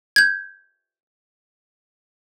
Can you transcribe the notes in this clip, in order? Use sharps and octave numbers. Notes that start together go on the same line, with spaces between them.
G6 G#6